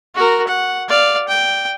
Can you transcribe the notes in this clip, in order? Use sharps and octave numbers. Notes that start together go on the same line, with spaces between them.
F#4 A#4
F#5
D5 F5
G5